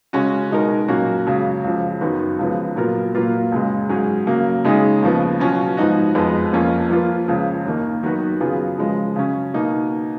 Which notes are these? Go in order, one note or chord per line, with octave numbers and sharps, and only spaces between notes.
C#3 G#3 C#4 F#4
B2 G#3 D#4 A#4
A#2 F#3 A#3 C#4 F#4
C#2 C#3 F#3
C#2 C#3 F3
F#2 D#3 F#3 B3 F#4
C#2 C#3 F3 B3
A#2 F#3 B3 F4 A#4
A#2 F#3 A#3 F4 B4
C#2 C#3 G#3
G#2 F#3 C#4 G#4
C#3 F#3 A#3
C#3 G#3 D#4 G#4
D#2 C#3 F3 B3
B2 F#3 C#4 F4
G#2 F3 B3 D#4 F#4
F2 F3 G#3 B3
F2 F3 A#3 C#4 F4
F3 A#3 F4 B4
C#2 C#3 F3
D#2 D#3 A#3 D#4
D#3 F#3 B3 F#4 B4
C#3 F#3 B3 F4 G#4
C#3 F3 G#3
C#3 F#3 C#4
B2 A#3 D#4